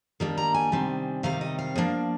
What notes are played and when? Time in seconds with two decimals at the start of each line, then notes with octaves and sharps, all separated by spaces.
0.20 D#3 G3 A#3 D4
0.38 A#5
0.54 G#5
0.72 C3 D#3 G3 C4
1.23 C3 D#3 G3 C4 F5
1.41 D#5
1.59 F5
1.76 F3 A#3 D4